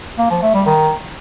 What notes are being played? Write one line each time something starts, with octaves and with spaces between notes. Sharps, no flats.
A#3
F3
A3
G3
D#3